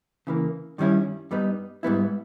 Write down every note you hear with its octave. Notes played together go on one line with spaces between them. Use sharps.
C#3 E3 A#3
G2 D#3 G3 C#4 E4
G2 G3 B3 D#4
G#2 G3 B3 E4